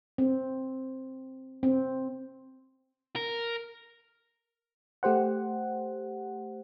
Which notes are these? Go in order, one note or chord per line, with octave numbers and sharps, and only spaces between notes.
C4
C4
A#4
A3 G4 C5 F#5